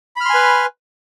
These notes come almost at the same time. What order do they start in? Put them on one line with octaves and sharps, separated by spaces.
B5 F6 C6 G#5 B4